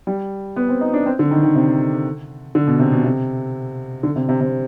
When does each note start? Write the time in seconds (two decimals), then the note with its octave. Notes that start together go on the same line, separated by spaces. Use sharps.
0.07 G3
0.56 B3
0.69 C4
0.81 D#4
0.93 D4
1.06 C4
1.19 D3
1.31 D#3
1.43 D#3
1.55 C3
2.55 D3
2.67 B2
2.80 C3
2.92 B2
3.04 C3
4.03 D3
4.16 C3
4.29 C3
4.41 C3